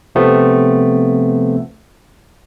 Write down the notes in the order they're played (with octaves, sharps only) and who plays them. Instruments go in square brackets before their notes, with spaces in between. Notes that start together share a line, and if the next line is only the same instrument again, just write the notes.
[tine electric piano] C3 F3 A3 B3 C4